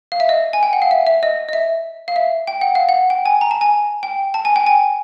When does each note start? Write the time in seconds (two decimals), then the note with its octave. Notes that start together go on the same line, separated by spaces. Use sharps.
0.12 F5
0.20 E5
0.29 D#5
0.53 G#5
0.63 G5
0.73 F#5
0.82 F5
0.91 E5
1.07 E5
1.23 D#5
1.49 D#5
1.53 E5
2.08 F5
2.16 E5
2.47 G5
2.61 F#5
2.75 F5
2.89 F#5
3.10 G5
3.26 G#5
3.41 A#5
3.51 A5
3.61 G#5
4.03 G5
4.34 A5
4.45 G#5
4.56 G5
4.66 G#5